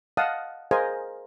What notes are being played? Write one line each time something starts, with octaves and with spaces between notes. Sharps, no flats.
D#5 F5 F#5 A5 D#6
G#4 A#4 C5 D#5 F5 G#5